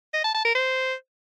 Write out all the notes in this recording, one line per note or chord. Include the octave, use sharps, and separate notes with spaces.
D#5
A5
A5
A#4
C5